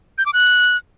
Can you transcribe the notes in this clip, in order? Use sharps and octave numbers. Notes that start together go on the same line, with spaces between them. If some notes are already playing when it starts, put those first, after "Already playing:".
G6
D6
F#6